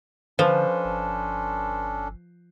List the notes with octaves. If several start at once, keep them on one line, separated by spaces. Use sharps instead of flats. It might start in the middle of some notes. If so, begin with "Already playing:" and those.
D3 F3 C#4 D4 A4 B4 C5
G1